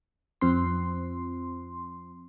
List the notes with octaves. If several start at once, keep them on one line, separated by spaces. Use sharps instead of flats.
F2 C4 C6